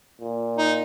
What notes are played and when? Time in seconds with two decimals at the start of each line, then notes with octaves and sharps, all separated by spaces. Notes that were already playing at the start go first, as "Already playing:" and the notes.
0.21 A#2
0.57 D#4